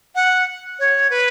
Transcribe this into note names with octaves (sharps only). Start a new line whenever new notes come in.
F#5
C#5
B4